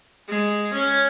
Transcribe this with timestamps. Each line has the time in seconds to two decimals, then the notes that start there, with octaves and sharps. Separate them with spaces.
0.28 G#3
0.73 C#4